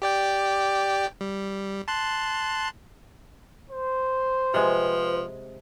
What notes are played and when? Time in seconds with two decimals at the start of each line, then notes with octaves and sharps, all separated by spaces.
0.02 G4 D5 G5
1.21 G3
1.88 A5 C6 F#6
3.70 C5
4.54 C3 F3 G#3 B4